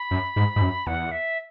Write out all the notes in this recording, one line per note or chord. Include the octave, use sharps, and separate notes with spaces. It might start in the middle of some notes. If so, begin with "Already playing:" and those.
Already playing: B5
F#2
G#2
G#2
F#2
E2 F#5
E5